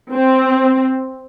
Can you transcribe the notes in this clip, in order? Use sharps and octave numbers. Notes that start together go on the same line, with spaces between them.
C4